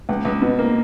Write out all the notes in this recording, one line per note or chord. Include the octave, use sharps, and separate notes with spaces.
C#2
C#2
B2
A#3